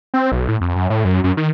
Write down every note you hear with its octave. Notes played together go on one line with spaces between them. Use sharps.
C4
B1
A2
F2
F#2
A2
F#2
F#2
D#3